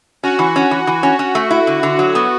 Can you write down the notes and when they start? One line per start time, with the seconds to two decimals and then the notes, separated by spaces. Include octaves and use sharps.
0.23 C#4 F#4
0.39 E3
0.56 C#4
0.71 E3
0.87 E3
1.03 C#4
1.19 C#4
1.35 A3
1.51 E4
1.67 D3
1.83 D3
1.99 F#3
2.15 B3